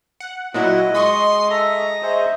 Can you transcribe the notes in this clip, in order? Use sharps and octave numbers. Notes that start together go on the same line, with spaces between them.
F#5
A#2 F#3 E4 F#4 D#5 F#5
G#3 C6 C#6 D#6
A4 E5 A#5
G#4 C5 D#5 E5